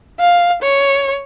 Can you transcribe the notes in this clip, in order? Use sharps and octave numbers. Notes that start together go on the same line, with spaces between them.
F5
C#5